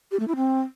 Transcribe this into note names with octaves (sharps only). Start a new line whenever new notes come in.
G4
A3
E4
C4